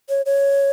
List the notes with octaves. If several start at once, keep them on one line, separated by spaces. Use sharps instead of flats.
C#5
C#5